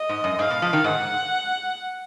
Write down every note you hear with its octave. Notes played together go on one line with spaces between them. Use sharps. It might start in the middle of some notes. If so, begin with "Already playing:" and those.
Already playing: D#5
G#2
F#2
G#2 F5
B2
F3
D#3
G#2 F#5